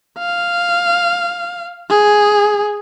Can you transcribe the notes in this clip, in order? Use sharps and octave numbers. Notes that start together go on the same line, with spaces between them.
F5
G#4